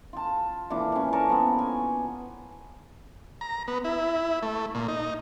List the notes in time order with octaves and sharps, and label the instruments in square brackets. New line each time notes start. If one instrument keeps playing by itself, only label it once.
[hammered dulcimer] F4 A5
A#2 E3 D4 D6
E3 C#4
D4 A#4 C#5 A5
F3 B3
G#5
[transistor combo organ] A#5
B3
E4
A3
A#2
D#4